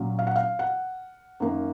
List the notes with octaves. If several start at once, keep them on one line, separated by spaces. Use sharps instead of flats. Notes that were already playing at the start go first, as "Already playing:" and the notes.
Already playing: A#2 F#3 A#3 C#4
F5
F#5
F5
F#5
F#2 D#3 A#3 C#4